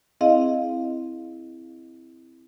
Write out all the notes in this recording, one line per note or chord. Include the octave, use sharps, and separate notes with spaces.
C4 E4 G#4 D#5 F5